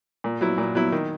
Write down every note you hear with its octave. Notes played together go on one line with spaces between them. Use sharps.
A#2
F#3 B3 E4
A#2
F#3 B3 E4
D#3